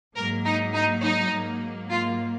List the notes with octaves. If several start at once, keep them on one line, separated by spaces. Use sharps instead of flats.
G#2 F#3 A#3 A#4
D#4
D#4
D#4
G#2 F#3 A#3
F4